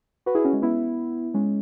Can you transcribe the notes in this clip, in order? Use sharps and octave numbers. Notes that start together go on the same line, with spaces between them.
F#4 B4
E4 G#4
C#4 F#4
G#3
B3 E4
G#3 C#4